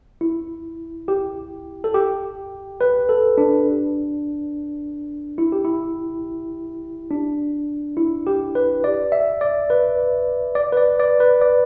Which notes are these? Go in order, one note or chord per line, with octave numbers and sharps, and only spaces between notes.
E4
G4
A4
G4
B4
A4
D4
E4
G4
E4
D4
E4
G4
B4
D5
E5
D5
B4
D5
B4
D5
D5
B4
D5